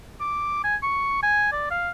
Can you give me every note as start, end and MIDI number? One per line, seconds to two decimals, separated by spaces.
0.21 0.62 86
0.64 0.76 80
0.83 1.18 85
1.23 1.49 80
1.52 1.71 74
1.71 1.91 77